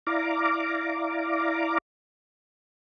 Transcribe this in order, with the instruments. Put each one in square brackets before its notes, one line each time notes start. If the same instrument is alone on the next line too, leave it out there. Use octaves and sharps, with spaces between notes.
[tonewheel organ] E4 D5 F5 A#5 D6